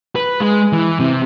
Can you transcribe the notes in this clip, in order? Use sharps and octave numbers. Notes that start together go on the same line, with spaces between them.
B4
G#3
E3
C3